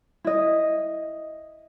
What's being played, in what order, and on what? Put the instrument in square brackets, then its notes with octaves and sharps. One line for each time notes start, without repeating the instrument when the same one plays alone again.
[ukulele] E4 D#5